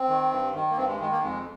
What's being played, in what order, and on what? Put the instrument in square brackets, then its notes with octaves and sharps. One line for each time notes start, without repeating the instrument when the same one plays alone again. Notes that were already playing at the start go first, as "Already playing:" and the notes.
Already playing: [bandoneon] C4
D#3
G2
D#3
A#3
G2 C4
G#3
D#3 G#3
A#3
F2 G#3